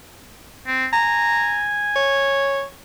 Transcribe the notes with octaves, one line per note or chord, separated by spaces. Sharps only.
C4
G#5 A#5
C#5